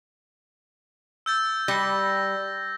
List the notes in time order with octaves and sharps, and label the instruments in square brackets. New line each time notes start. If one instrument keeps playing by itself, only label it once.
[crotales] E6 G6 A6
[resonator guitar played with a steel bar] G3 [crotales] G6 A#6